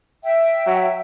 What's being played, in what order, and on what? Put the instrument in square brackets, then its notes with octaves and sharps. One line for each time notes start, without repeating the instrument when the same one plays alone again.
[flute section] E5 G5
[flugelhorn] F#3